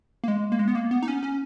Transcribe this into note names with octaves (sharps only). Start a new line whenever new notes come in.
A#3
G#3
A#3
G#3
B3
A#3
B3
D#4
C#4
C#4